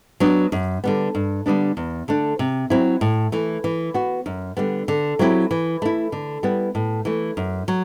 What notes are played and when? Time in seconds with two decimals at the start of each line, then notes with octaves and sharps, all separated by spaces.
0.20 F#3 B3 D4
0.52 F#2
0.84 D3 G3 B3
1.15 G2
1.46 D3 G3 B3 D4
1.77 E2
2.08 D3 A3 D4
2.39 C3
2.70 F#3 C4 E4
3.01 A2
3.32 E3 A3
3.64 E3
3.94 B3 F#4
4.26 F#2
4.57 D3 G3 B3
4.88 D3
5.19 F#3 C4 E4 G4
5.51 E3
5.82 A3 E4
6.12 D3
6.43 G3 B3 E4
6.75 A2
7.05 E3 A3
7.37 F#2
7.68 F#3